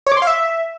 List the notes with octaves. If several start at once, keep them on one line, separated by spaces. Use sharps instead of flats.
C#5
D6
C6
F5
E5